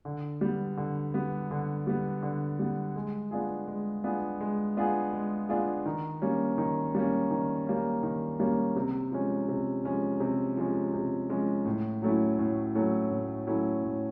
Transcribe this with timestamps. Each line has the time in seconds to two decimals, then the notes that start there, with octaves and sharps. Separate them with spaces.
0.05 D3
0.41 G3 B3
0.77 D3
1.14 G3 B3
1.51 D3
1.87 G3 B3
2.22 D3
2.59 G3 B3
2.96 G#3
3.31 B3 D4 F4 G#4
3.68 G#3
4.04 B3 D4 F4 G#4
4.41 G#3
4.77 B3 D4 F4 G#4
5.13 G#3
5.49 B3 D4 F4 G#4
5.86 D#3
6.22 G3 A#3 C#4
6.58 D#3
6.95 G3 A#3 C#4
7.31 D#3
7.67 G3 A#3 C#4
8.03 D#3
8.40 G3 A#3 C#4
8.76 C3
9.12 F3 G#3 C#4
9.48 C3
9.84 F3 G#3 C#4
10.20 C3
10.57 F3 G#3 C#4
10.93 C3
11.29 F3 G#3 C#4
11.65 A2
12.02 F#3 A3 C#4 E4
12.39 A2
12.75 F#3 A3 C#4 E4
13.11 A2
13.47 F#3 A3 C#4 E4
13.83 A2